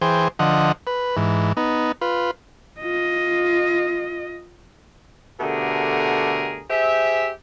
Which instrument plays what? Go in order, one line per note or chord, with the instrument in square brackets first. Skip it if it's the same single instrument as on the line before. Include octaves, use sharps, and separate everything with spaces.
[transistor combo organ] E3 G#4 C5 G5
D3 F3 D#5 F#5
B4
G#2 E3
B3 D#4
F4 B4
[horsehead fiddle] F4 D#5
[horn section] B2 D3 A3 G4 G#4 A#4
G4 G#4 C5 E5